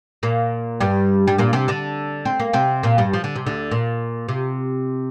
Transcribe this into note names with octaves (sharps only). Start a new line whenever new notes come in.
A#2 A#3
G2 G3
G3
A#2 A#3
C3 C4
D3 D4
C4
A#3
C3 C4
A#2 A#3
G2 G3
F3
D3
C3
D2 D3
A#2
C3